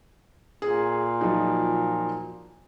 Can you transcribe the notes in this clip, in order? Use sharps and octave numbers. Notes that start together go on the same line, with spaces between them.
A#2 G#4
F3 F#3 D#4